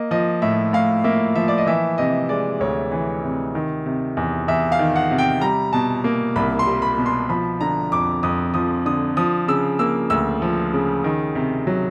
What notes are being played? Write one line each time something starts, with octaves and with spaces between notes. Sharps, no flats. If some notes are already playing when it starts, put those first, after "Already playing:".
Already playing: A#3 D#5
F3 D#5
A2 E5
A2 F5
A#3 E5
F3 E5
D5
D#5
E3 E5
C3 D#5
G#3 D5
D2 C#5
E3
C3
D#3
C3
E2
E2 E5
F5
D#3
F#5
C3
G5
G3 A#5
B2 A5
A#3
C2 B5
C6
G3
B5
B2
C6
F3 B5
D3 A#5
F2 D6
F2 D#6
F3 D#6
D3 D#6
F3 D#6
C#3 E6
A#3 E6
D2 E6
F3
C#3
D#3
C3
F#3